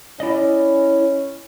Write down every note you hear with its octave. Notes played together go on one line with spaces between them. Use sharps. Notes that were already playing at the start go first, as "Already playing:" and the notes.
C#4 E4 D5 D#5